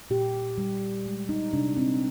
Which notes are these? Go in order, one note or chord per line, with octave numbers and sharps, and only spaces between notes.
A#2 G4
G3
G#3
D#4
C3 D4
C4